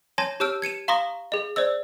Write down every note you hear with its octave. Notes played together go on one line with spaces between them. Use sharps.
C#5 G#5 A5 C6 G#6 A#6
G4 C#5 A5 E6 F6 D7
G#6 C#7 D#7 E7
F5 A#5 C6 C#6 D#6 A#6
G#4 D#5
C5 D5 D#5 E6